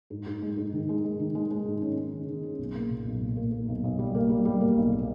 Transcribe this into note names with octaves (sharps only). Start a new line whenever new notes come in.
G#2
G#2
G#3
G#2
D#3
G#3
G#3
D#3
G#3
G#3
G#2
C#4
C#4
D#3
D#3
C#4
B1
A#3
A#2
B1
A#2
A#3
A#3
B1
B1
G3
A#3
G3
G3
A#3
B1
A#3